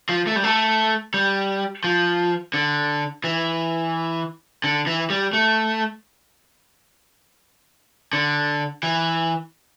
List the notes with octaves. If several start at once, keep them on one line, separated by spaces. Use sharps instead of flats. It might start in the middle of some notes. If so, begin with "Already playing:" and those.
F3
A3
G3
A3
G3
F3
D3
E3
D3
E3
G3
A3
D3
E3